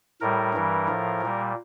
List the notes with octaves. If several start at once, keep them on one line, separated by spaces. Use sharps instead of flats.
A2 G3 A#4
G2 E3 G3
A2 F3
A#2 G3